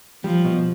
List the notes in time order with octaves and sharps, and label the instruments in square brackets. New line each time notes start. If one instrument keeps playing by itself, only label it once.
[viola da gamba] F3 [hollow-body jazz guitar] G3
[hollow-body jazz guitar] B2